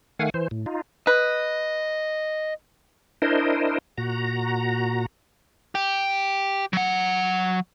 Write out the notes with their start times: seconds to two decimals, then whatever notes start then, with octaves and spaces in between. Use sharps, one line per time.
0.19 D#3 A3 F5 F#5 G#5
0.34 E3 C5
0.51 A2
0.66 D#4 F4
1.07 B4 D#5
3.22 D4 E4 A#4 C5 D#5
3.98 A#2 F#4 A#5
5.75 G4
6.73 F#3 F#5